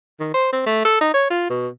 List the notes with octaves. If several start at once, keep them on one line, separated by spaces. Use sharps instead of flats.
D#3
C5
C4
A3
A4
D#4
C#5
F4
B2